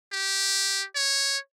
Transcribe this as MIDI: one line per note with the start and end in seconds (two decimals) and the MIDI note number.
0.13 0.84 67
0.96 1.38 73